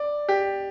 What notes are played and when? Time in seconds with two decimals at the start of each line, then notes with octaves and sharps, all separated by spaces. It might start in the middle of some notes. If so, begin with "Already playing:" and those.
Already playing: D5
0.29 G4